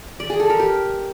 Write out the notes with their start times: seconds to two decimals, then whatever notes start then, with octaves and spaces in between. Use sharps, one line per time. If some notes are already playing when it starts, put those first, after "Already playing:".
0.20 D5
0.30 G#4
0.40 A4
0.50 A#4
0.60 G4